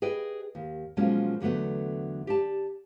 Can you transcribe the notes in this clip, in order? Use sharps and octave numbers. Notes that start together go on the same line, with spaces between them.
G#4 B4 D#5 G5
D#2
B2 F3 F#3 G#3 A#3 C#4
E2 D3 F#3 A3 B3
G4 D5 A5